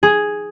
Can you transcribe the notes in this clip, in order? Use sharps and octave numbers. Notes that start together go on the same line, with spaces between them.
G#4